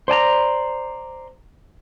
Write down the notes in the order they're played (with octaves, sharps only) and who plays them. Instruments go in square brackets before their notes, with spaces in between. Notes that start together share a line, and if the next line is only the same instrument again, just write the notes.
[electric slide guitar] C5 D5 A5 A#5